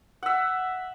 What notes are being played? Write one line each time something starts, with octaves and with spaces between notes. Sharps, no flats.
E5 F#5